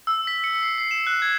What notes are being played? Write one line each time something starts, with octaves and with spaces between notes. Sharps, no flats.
E6
B6
C#7
C7
C7
E7
F#6
G#6